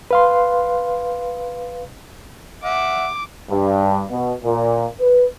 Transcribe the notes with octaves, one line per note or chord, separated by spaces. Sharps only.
B4 F5 C6
E5 F#5 D6
G2
B2
A#2
B4